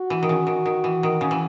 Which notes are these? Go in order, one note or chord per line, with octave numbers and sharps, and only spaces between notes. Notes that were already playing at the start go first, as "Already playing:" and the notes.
Already playing: F#4
E3
D#3
C#3
D#3
D#3
E3
D#3
C#3
E3